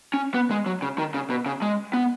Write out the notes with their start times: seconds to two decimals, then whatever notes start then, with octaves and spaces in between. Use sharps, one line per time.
0.14 C#4
0.34 B3
0.51 G#3
0.66 F#3
0.82 C#3
0.98 D#3
1.14 C#3
1.30 B2
1.46 C#3
1.62 G#3
1.93 B3